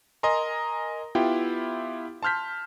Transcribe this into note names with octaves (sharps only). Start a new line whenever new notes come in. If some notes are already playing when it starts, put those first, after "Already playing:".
A#4 D#5 G#5 A#5 C6
B3 E4 F4 G4 G5
A5 C6 F6 G6 B6